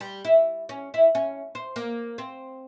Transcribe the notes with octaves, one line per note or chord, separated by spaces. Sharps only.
G3
E4
C#4
E4
C#4
C5
A#3
C4